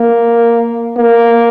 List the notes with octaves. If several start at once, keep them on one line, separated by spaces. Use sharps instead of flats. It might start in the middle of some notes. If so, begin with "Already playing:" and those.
Already playing: A#3
A#3